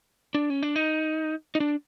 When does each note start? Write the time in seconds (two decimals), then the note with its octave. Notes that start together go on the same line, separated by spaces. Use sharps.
0.35 D4
0.50 C#4
0.63 D4
0.76 D#4
1.55 D#4
1.60 D4